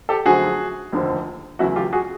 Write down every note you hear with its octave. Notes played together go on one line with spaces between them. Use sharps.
G4 A4
F#2 D3 F3 A3 F#4 G#4
F1 D#2 D3 F3
E2 C#3 F#3 A3 E4 F#4
F4 G4
F#4 G#4